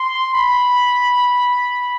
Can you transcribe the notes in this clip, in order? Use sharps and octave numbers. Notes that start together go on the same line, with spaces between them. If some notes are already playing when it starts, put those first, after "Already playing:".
Already playing: C6
B5